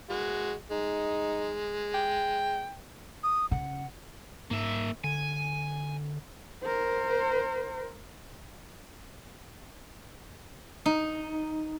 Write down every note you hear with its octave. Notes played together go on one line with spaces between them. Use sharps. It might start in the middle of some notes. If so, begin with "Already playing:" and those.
G#3 F#4
G#3 D#4
G5
D#6
C#3 F#5
G#2 A#3 E5
D3 G#5
A#4 C5
D#4